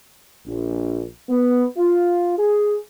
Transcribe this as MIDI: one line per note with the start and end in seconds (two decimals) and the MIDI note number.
0.46 1.03 34
1.28 1.64 59
1.76 2.33 65
2.37 2.75 68